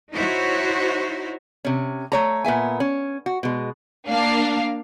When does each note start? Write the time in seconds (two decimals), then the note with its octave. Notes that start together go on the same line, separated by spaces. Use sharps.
0.14 D#4 E4 F#4 C5 C#5
1.65 C3 C#4
2.12 A3 C#5 A#5
2.45 A#2 B3 E5 G#5
2.80 C#4
3.26 F#4
3.43 B2 G#3
4.08 A#3 D4 F5